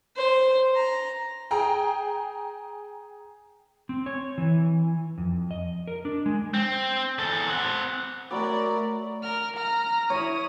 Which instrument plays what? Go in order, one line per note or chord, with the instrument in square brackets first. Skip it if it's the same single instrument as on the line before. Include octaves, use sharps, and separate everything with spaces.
[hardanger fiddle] C5
A#5
[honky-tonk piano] G#4 G5 A#5
[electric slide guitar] C4
C#5
E3
F2
D#5
A#4
D4
G#3
[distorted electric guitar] C4
E2 A4
C4 F#5
[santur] F#3 B5 D6 [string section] A3 A#4 D5
[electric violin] A#4 F6
A#5 F6
[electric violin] E4 D#6 [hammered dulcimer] C#5